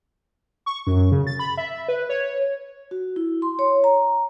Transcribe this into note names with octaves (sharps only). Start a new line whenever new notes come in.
C#6
F#2
C#3
A6
B5
E5
B4
C#5
F#4
E4
C6
C#5
A#5